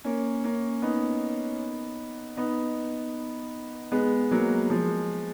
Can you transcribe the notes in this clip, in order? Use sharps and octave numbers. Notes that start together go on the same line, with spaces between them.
A#3 C#4
A#3 C#4
B3 D#4
B3 D#4
G#3 B3
F#3 A#3
F3 G#3